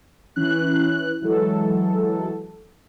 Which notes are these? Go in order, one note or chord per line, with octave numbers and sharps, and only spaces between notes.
E3 C#4 F#6
E3 F#3 G#3 A4